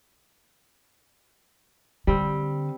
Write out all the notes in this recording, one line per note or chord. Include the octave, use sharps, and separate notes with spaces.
D3 G3 C4